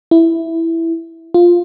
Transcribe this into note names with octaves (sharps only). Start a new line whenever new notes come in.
E4
F4